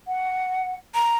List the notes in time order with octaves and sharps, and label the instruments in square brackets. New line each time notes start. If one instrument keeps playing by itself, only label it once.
[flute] F#5
[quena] A#5